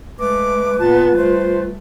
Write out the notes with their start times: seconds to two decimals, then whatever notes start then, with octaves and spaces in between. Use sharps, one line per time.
0.19 G#3 A3 B4 D6
0.79 A#2 B3 F4 A5
1.16 G3 A3 C5